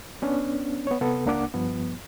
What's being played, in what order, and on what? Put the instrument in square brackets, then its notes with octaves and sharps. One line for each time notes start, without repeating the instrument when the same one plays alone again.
[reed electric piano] B3 C#4 D4
B3 C#5
C3 B3 A4
C#2 A#3 D4 F#5 D6
G2 F3 B3